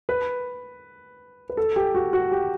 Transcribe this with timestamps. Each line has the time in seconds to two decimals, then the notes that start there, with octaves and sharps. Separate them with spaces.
0.09 B4
1.49 B4
1.57 A4
1.76 G4
1.95 F#4
2.13 F#4
2.32 G4